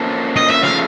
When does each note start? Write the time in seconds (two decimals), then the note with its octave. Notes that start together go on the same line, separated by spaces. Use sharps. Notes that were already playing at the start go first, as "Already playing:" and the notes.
Already playing: A#3 C#4 F4 A4 C5
0.36 D#5
0.50 E5
0.64 C#3 F3 A3 F5